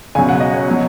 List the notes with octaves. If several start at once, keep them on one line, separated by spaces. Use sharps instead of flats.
C#2 B2 F#3 G#5
F#5
D#5
C#5
B2 F#3